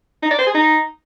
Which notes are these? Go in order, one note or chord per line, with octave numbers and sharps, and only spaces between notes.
D#4
D5
C5
G#4
D#4